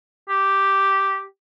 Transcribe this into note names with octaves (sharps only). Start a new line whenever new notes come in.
G4